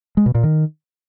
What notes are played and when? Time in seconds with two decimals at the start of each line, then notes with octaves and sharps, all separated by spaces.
0.17 G#3
0.26 B2
0.35 A#2
0.43 D#3